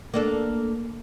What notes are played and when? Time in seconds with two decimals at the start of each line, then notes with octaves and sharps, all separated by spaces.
0.14 A#3 D4 A4